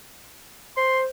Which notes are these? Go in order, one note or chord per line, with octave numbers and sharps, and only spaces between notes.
C5 C6